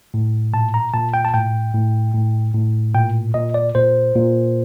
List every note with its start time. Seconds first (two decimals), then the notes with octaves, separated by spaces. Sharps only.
0.14 A2
0.53 A#2 A5
0.74 A#5
0.94 A#2 A5
1.14 G5
1.25 A5
1.34 A2 G5
1.74 A2
2.14 A2
2.54 A2
2.94 A#2 G5
3.34 A#2 D#5
3.54 D5
3.75 A#2 C5
4.15 A#2